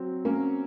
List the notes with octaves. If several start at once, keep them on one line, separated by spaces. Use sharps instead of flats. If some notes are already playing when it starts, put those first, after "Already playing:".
Already playing: F#3 C4
A#3 C#4